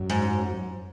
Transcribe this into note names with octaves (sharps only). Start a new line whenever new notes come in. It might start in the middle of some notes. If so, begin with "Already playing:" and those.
Already playing: F#2
G#2